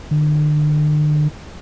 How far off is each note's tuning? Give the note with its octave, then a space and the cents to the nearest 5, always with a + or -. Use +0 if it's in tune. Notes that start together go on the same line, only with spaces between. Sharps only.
D3 +40